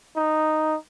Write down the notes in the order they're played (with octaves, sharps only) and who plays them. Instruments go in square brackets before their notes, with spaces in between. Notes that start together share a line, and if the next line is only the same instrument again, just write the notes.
[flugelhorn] D#4